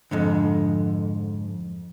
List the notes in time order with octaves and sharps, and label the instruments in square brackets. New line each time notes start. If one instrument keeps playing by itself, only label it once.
[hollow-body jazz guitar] F2 G#2 D3